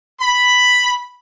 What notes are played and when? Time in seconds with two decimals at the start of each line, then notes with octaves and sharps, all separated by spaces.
0.20 B5